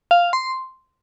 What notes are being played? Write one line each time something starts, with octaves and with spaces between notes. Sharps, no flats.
F5
C6